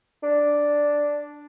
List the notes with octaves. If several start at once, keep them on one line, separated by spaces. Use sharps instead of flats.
D4